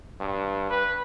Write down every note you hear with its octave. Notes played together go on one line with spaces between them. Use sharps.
G2
B4